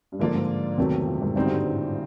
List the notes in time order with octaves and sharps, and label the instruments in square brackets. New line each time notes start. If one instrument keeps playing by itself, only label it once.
[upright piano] G2
[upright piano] G#2 [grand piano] D3 F3 A#3 D4 F4
[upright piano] G#2
[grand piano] E2 C3 D#3 F#3 A3
[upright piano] A#2
G#2
[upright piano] G#2 [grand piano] D3 G3 C4 D#4 F#4
[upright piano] G2
G#2
A2